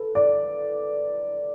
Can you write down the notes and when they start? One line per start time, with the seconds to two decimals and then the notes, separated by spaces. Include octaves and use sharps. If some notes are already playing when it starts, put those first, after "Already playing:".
Already playing: A4 B4
0.15 D5